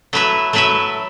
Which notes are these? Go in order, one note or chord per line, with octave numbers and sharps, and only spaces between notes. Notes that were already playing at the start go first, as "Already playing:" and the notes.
F#3 A3 E4 B4 E5
F#3 A3 E4 B4 E5